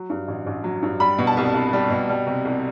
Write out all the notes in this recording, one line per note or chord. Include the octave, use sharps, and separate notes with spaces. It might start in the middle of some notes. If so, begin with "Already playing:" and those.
Already playing: F#3
G2
A1
A1
F#3
G2
G3 B5
B2
A5
C2
C2
G3
B2
G3
C3
C2